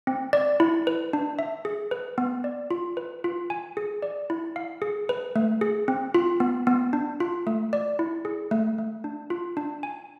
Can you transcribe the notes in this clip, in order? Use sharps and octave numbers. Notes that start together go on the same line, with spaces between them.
C4
D5
E4
B4
D4
E5
G#4
B4
B3
D5
F4
B4
F4
G#5
G#4
D5
E4
F5
G#4
B4
A3
G#4
C4
F4
B3
B3
D4
F4
A3
D5
E4
G#4
A3
A3
D4
F4
D4
G#5